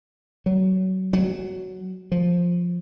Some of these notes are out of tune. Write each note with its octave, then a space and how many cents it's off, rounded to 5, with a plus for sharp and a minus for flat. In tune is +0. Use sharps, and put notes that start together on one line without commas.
F#3 +25
F#3 +5
F3 +10